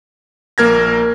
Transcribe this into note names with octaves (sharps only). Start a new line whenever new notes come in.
A#1 A#3 A#4 G#6 A#6